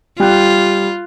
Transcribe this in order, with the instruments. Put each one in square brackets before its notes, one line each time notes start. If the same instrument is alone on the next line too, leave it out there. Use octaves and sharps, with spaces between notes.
[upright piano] G3 G5 F#6 [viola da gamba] F4